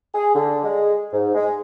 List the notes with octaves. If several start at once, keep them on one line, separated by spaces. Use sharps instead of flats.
G#4
D3
G#3
G#2
G#3